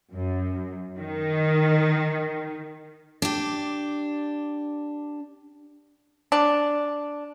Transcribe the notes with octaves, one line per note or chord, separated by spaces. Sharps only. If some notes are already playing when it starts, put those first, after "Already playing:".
F#2
D#3
D4 G4
D4